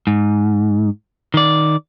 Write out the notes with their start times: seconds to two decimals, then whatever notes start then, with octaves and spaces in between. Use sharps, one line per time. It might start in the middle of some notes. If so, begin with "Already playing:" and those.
0.07 G#2
1.34 D#3 D5